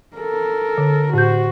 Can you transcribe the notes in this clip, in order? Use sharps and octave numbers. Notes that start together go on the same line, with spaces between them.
A4 A#4
D3
A2 F#4 C5 G6